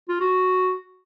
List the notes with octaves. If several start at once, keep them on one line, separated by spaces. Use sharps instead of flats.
F4
F#4